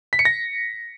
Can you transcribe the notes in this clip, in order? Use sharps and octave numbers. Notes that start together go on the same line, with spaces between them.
B6
C#7
A#6